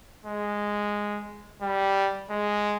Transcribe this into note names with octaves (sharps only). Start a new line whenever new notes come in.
G#3
G3
G#3